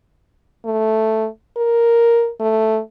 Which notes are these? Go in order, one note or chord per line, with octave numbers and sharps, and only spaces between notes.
A3
A#4
A3